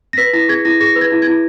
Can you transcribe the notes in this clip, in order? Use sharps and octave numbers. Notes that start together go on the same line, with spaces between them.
A#6
B4 B6
E4 A#6
G#4 G#6
E4 A#6
G#4 A#6
B4
G#6
E4
G#6
E4